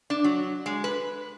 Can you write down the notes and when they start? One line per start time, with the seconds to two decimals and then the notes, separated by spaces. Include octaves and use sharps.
0.10 D4
0.24 F#3
0.66 G#3
0.84 B4